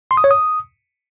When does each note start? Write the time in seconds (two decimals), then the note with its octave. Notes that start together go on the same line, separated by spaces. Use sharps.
0.11 C6
0.17 D#6
0.24 C#5
0.31 D#6